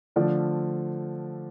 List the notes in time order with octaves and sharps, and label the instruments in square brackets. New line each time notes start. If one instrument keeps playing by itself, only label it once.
[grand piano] D3 F3 A3 D5